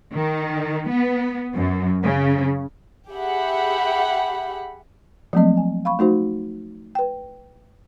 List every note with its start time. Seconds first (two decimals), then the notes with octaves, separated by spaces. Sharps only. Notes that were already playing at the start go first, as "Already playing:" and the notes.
0.14 D#3
0.90 B3
1.55 F#2
2.04 C#3
3.10 G4 G#4 E5 F#5 B5
5.33 F3 F#3 A3 A#3 C4 D#5
5.57 G#5
5.85 F5 B5 C#6
5.99 A3 D#4 F#4 C5
6.95 B4 G5